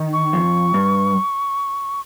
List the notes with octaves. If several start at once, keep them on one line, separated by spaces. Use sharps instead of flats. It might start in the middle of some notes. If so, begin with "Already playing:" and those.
Already playing: D#3
C#6
F2
G2